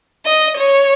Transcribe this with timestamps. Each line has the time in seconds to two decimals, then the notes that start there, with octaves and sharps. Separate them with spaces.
0.25 D#5
0.57 C#5